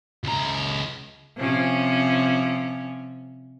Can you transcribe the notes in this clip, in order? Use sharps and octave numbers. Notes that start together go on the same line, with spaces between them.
C#2 A#5
C3 F3 C#4